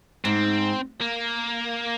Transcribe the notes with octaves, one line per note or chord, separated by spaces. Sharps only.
G#2 C4
A#3